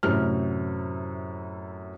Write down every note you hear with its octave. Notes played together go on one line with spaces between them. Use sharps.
F#2 A2 C3 F6